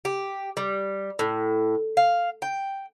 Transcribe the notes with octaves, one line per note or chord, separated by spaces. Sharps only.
G4
G3
A2
F5
G5